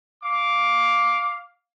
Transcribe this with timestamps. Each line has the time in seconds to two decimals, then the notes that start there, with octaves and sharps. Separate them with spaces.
0.23 F5 D6